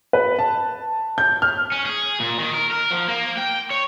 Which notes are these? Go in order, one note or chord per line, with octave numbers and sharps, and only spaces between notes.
B4
A5
G6
F6
C#4
G#4
A#2
D#3
A#4
A#4
F3
A#3
G5
C#5